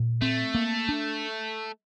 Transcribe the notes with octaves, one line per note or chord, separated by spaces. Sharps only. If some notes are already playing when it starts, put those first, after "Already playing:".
Already playing: A#2
A3 C4
A#3
D4